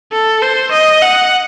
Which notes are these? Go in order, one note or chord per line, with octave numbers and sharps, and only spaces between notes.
A4
C5
D#5
F#5